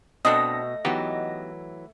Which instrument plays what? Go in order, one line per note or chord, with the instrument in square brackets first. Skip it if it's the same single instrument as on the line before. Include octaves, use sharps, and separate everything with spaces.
[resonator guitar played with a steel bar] B2 [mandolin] A3 D#6 [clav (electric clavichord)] C4 D4 A4 [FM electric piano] D#5 A#6
[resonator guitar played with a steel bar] E3 F#3 [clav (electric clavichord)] B3 D#4 G4